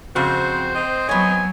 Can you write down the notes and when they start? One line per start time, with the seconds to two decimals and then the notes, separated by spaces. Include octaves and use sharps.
0.16 F2 C#3 C4 F#4 C5
0.75 C4 D#5
1.09 F#3 B3 C#5 G#5